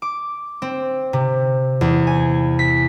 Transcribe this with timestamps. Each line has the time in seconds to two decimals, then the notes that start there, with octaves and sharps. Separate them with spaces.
0.02 D6
0.62 C4
1.13 C3
1.81 E2
2.07 G#5
2.59 B6